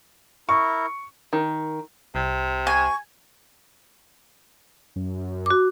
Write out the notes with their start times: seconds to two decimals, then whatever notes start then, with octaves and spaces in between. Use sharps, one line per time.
0.49 E4 A#4 C#6
1.33 D#3
2.15 C2 C3
2.67 G#5 C#6
4.96 F#2
5.46 F#4 D6